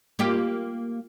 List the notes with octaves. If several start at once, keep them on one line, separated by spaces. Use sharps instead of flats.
A#3 F4 G4